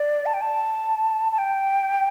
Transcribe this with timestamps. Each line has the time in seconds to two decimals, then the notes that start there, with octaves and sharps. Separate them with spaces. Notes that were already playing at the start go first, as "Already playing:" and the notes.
Already playing: D5
0.26 A5
0.34 G5
0.41 A5
1.32 A5
1.38 G5